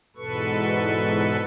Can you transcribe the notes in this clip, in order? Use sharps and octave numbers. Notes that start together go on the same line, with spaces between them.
E2 G#2 B2 A4 B4 C#6